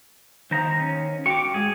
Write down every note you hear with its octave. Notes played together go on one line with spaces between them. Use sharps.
D#3 D#4 C5 F5 A#5
C#4
F#4 F5 G5 C#6 D6
G#2 G#3 G#4